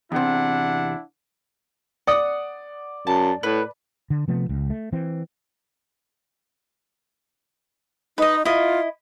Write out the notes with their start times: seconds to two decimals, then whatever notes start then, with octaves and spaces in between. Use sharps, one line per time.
0.12 E2 C3 D4 E4 F#5
2.07 D5 F#5 D#6
3.07 F#2 A5
3.43 A2 B4
4.10 D3
4.28 C3 F3 A3 B3
4.49 C#2
4.70 A3
4.93 E3 C4
8.18 D#4 B4 D#5
8.45 E4 F4 D#5